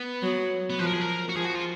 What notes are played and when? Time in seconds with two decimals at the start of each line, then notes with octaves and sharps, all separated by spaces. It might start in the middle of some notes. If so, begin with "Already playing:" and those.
Already playing: B3
0.22 F#3
0.70 B3
0.79 F3 B4
0.87 A#4
0.94 G#4
1.01 A#4
1.29 F#4
1.35 F3 G#4
1.45 F#4
1.55 F4